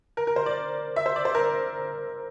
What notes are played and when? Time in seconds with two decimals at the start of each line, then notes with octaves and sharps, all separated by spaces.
0.17 A#4
0.27 A#4
0.36 C5
0.46 D5
0.96 E5
1.06 C5
1.16 D5
1.25 C5
1.35 A#4